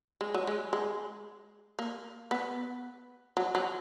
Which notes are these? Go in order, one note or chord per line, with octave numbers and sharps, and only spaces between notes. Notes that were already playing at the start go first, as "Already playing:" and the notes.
G#3
F#3
G#3
G#3
A#3
B3
F#3
F#3